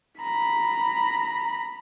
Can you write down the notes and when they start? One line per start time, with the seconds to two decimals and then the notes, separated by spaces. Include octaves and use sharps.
0.22 A#5 B5